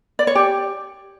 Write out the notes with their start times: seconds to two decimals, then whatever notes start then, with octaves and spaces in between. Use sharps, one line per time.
0.19 D5
0.27 C#5
0.35 G4